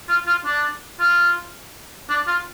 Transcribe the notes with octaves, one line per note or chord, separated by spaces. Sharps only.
F4
F4
D4
F4
D4
F4